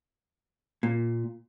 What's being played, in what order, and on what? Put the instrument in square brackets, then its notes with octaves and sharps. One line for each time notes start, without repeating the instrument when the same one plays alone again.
[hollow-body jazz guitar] A#2